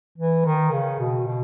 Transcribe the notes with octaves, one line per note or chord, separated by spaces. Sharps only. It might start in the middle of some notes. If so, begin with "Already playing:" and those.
E3
D#3
C#3
B2
B2